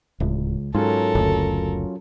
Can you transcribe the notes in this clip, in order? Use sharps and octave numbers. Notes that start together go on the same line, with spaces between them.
D1 C#2
G#2 F#3 C#4 F4 A4 A#4
F#1 D2